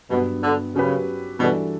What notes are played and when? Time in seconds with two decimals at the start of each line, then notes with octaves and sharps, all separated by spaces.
0.10 G2 B2 F#3 B3
0.43 D3
0.75 C#3 F#3 C#4 G4 B4
1.40 B2 E3 G3 D4 F#4 A4